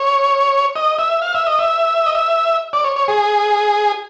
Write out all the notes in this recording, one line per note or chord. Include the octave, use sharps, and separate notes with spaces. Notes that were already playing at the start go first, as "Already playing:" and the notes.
Already playing: C#5
D#5
E5
F5
E5
D#5
E5
D#5
E5
D5
C#5
C#5
G#4